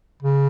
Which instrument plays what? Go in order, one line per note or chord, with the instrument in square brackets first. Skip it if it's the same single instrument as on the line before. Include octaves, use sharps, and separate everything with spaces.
[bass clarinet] C#3